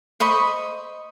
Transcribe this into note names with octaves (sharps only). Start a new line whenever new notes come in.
C5 D#5 B5 C#6